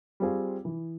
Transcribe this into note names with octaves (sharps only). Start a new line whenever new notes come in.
G3 C4 F4 G#4
E3